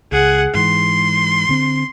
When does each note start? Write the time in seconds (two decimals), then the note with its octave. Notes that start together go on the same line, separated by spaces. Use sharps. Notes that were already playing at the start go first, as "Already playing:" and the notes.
0.12 C#2 G#4 F#5
0.54 G#2 E3 C6
1.49 D3 C4